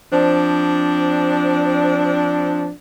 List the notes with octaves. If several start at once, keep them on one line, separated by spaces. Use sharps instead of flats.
F3 C4 D4